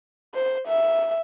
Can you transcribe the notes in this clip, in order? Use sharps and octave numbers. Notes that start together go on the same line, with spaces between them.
C5
E5